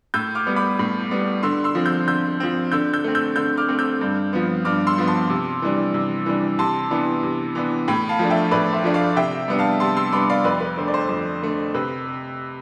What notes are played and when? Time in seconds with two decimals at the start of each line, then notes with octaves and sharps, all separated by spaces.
0.14 A2 E6 G6
0.35 D6 F6
0.47 G3 B3
0.56 B5 D6
0.79 A2
1.11 G3 B3
1.43 D3 C6 E6
1.64 C6 E6
1.75 F3 C4
1.86 E6 G6
2.07 D3 E6 G6
2.40 F3 C4
2.72 D3 E6 G6
2.93 E6 G6
3.04 A3 C4
3.15 E6 G6
3.36 D3 E6 G6
3.57 D6 F6
3.69 A3 C4
3.79 E6 G6
4.01 G2
4.33 F3 B3
4.65 G2 D6 F6
4.87 C6 E6
4.98 F3 B3
5.08 A5 C6
5.30 C3
5.62 E3 G3 D4
5.94 C3
6.26 E3 G3 D4
6.59 C3 A5 C6
6.91 E3 B3 D4
7.23 C3
7.55 E3 B3 D4
7.88 A2 G5 B5
8.09 F5 A5
8.19 F3 A3 D4
8.30 E5 G5
8.51 A2 B4 D5
8.73 C5 E5
8.84 F3 A3 D4
8.94 D5 F5
9.16 C3 E5 G5
9.48 G3 B3 D4
9.59 F5 A5
9.80 C3 A5 C6
9.97 C6 E6
10.13 G3 B3 D4 B5 D6
10.30 D5 F5
10.45 F2 B4 D5
10.61 B4
10.77 D3 A3 C5
10.88 D5
10.94 C5
11.09 F2
11.42 D3 A3
11.74 C3 B4